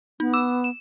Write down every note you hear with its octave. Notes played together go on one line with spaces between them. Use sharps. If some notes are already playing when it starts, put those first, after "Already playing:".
B3 D#4
D6 E6 E7
E7